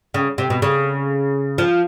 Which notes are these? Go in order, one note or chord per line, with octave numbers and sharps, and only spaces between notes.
C#3
C3
B2
C#3
F3